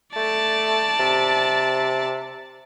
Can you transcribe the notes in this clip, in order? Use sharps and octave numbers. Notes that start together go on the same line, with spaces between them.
A3 D5 A5
C3